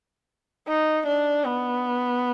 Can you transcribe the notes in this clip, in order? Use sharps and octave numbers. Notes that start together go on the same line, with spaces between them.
D#4
D4
B3